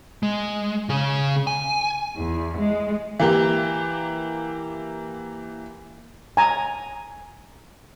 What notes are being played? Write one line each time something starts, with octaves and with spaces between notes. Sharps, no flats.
G#3
C#3 G#4
G#5
E2
G#3
E3 A#3 G4
G#5 A#5